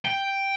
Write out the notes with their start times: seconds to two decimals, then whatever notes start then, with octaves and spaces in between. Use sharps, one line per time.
0.05 G5